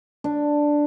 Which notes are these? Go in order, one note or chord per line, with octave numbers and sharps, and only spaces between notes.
D4